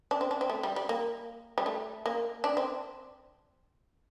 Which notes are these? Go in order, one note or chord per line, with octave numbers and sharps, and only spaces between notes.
D4
C4
D4
C4
A3
G3
G3
A#3
G3
A3
A#3
D4
C4